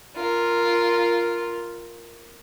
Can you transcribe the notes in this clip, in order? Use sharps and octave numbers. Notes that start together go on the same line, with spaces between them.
F4 A#4